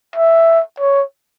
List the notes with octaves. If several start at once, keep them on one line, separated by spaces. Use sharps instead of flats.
E5
C#5